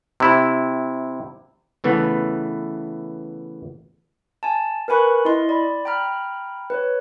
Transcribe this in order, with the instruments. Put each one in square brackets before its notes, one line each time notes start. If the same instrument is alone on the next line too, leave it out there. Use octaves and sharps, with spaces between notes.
[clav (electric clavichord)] C3 E4
C#3 E3 A3 B3
[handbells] G#5 A5
A#4 B4 G#5 B5 C#6 F#6
E4 D#5 C6
D5 B5
G5 A#5 B5 F6
B4 C#5